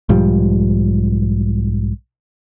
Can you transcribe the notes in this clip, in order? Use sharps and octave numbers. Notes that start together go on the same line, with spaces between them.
B1 G#2 F3 G3